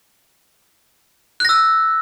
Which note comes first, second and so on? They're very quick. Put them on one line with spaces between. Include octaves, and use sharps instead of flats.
F#6 A#6 E6